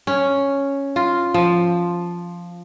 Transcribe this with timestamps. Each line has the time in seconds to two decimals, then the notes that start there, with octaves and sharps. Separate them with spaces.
0.07 C#4
0.96 F4
1.34 F3